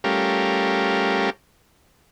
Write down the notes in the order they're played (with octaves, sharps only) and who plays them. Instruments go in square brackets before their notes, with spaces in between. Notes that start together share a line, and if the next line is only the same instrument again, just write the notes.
[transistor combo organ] G3 A3 C#4 F4 G4 A#4